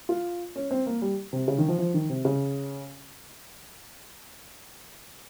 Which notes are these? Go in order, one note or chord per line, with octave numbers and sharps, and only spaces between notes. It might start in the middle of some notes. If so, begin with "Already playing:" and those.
F4
C#4
C4
A#3
G3
C3
C#3
D#3
F3
F3
D#3
C3
C#3